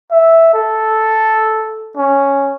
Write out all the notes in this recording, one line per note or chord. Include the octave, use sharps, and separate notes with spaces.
E5
A4
C#4